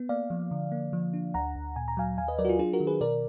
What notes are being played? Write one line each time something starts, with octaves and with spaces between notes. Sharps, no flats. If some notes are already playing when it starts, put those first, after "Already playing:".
Already playing: B3
A#3 D5 F5
F3
D3
A#3
F3
D4
D2 F#5 A#5
D2
A#2 G#5
A#5
F#3 F5 G#5
D#2 F5 G#5
B4 D#5
F#3 A#4 D5
F#4
F4
D4 F4 G#4
F#4 A#4
D#3
G#4 B4
B2 A#4 D5